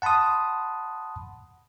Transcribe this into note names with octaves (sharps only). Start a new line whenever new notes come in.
F#5 A5 B5 C6 D#6